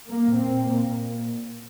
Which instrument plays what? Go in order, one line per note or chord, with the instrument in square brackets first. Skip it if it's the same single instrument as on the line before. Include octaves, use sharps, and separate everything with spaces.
[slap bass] G3 [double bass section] A#3
[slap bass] A#2
[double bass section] C4
[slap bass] A#2
[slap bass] A#2 [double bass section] A#3
[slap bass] A#2